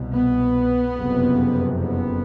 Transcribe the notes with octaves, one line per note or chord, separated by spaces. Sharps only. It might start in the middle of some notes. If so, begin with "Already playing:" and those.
Already playing: C2 B2
B3
F#1 F2 C3
B3